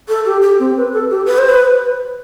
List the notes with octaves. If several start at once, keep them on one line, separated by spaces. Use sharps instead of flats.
A4
G4
G4
C4
B4
A4
G4
B4
C5
B4